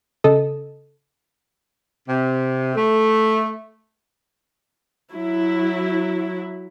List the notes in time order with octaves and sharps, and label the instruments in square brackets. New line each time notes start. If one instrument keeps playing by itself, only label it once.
[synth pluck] C#3 A4 D#5
[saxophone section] C3
A3
[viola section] F#3 E4